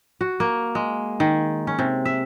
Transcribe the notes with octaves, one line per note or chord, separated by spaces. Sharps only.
F#4
A#3
G#3
D#3
C#4
C3
E5